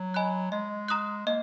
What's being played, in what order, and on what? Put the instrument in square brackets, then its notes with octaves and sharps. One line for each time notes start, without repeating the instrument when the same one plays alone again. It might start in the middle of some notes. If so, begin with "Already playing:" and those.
Already playing: [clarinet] F#3
[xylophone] D#5 G#5 B5 F#6
[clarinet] G#3 [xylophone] D#5
[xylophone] A#5 D#6 F#6
[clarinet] A#3 [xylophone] D#5